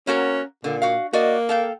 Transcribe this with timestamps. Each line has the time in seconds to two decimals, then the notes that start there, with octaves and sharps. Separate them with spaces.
0.07 A#3 C#4 F#4 A#4
0.64 A#2 D3
0.82 F#4 F5
1.13 A#3 F#4 D5 D#5
1.49 A4 F5 G5